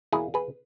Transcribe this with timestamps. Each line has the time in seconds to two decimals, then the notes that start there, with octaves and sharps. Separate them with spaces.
0.13 E2 B2 A#3 E4 G#4
0.34 G#4 B4